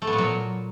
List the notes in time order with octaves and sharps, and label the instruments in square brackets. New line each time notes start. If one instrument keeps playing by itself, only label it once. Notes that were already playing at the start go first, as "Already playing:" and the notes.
[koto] A3
B3
A#2
F#3